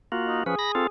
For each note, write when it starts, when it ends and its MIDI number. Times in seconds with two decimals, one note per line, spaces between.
0.12 0.43 58
0.12 0.43 65
0.12 0.43 66
0.27 0.41 63
0.46 0.55 53
0.46 0.55 61
0.46 0.89 68
0.46 0.55 71
0.59 0.72 83
0.59 0.72 94
0.75 0.87 60
0.75 0.87 65
0.75 0.87 69